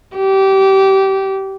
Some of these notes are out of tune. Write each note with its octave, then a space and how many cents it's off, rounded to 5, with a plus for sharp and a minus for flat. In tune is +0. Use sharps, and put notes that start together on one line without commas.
G4 -25